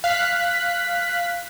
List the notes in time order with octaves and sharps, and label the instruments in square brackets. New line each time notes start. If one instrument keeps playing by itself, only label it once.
[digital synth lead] F5 [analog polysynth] F#6 B6